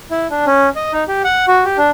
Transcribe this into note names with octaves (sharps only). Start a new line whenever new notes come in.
E4
D4
C#4
D#5
D#4
G4
F#5
F#4
G4
D4